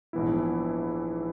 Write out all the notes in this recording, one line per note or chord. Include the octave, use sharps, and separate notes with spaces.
A#1 G#2 E3 B3 E4